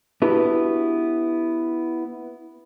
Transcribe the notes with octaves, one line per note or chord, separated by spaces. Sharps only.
B3 D4 E4 F#4 G4 B4